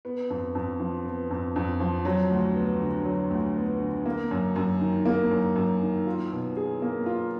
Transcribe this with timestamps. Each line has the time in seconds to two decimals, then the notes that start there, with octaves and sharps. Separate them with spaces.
0.05 B3
0.30 F2
0.55 F2
0.80 F3
1.06 B3
1.30 F2
1.56 F2
1.80 F3
2.05 F#3
2.31 D2
2.55 B3
2.80 D3
3.05 F#3
3.30 D2
3.56 B3
3.80 D3
4.06 A#3
4.31 F#2
4.56 F#2
4.81 D#3
5.05 A#3
5.31 F#2
5.55 F#2
5.82 D#3
6.07 F4
6.32 B2
6.57 G#4
6.82 A#3
7.06 F4